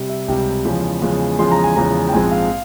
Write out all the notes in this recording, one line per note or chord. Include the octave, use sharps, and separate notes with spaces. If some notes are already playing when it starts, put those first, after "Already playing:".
Already playing: C3 G3
E5
C#2 C3 G3 G5
E2 C#3 F3 G#3
E2 C#3 F3 G#3
E2 C#3 F3 G#3 C6
A#5
G#5
E2 C#3 F3 G#3 A#5
G5
A#1 G#2 F3 G#3 C4 G#5
F5